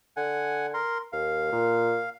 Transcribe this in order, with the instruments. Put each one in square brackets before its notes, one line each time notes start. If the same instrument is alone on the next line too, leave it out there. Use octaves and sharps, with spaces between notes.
[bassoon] D3 [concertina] F#5 G#5
[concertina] A#4 C6
[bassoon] D#2 [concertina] F5
[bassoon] A#2